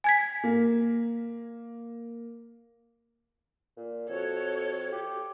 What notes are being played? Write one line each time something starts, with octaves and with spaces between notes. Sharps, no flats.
G#5 G#6 B6
A#3
A#2
F2 F#4 A4 C#5
G4